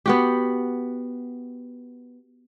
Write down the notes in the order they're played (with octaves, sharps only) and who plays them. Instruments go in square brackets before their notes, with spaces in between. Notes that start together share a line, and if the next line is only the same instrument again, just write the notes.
[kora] B3 F#4 G4